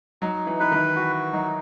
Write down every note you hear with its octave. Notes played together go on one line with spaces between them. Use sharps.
F#3 D#4
E3
E3 B4
D#3
E3 F#4
F#3 D#4